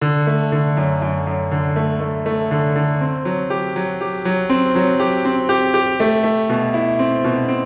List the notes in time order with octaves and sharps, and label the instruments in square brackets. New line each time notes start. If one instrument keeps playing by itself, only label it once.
[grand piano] D3
A3
D3
F#2
F#2
F#2
D3
A3
A3
A3
D3
D3
C4
F#3
G4
F#3
G4
F#3
C4
F#3
G4
C4
G4
G4
A3
A3
B2
E4
C4
B2
C4